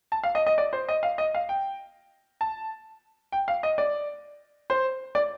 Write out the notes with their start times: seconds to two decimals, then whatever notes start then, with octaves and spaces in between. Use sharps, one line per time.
0.12 A5
0.23 F5
0.35 D#5
0.46 D#5
0.58 D5
0.73 C5
0.89 D#5
1.03 F5
1.18 D#5
1.35 F5
1.49 G5
2.41 A5
3.32 G5
3.48 F5
3.63 D#5
3.78 D5
4.70 C5
5.15 D5